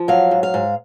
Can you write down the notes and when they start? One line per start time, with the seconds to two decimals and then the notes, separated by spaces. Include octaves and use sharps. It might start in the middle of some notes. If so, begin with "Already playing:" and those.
Already playing: F3
0.08 F#3 F5
0.31 G#2
0.43 F5
0.54 G#2